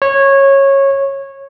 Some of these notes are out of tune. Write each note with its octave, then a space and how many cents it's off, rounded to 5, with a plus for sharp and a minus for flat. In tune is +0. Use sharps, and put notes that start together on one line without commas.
C#5 -15